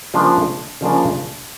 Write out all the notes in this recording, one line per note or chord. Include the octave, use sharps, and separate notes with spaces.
C#3 F3 A#3 D4
C#3 F3 A#3 D4